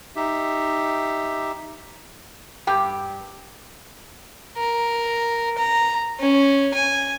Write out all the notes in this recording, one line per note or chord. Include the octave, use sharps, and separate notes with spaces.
D#4 G4 E5
G2 G4 G5
A#4
A#5
C#4
G#5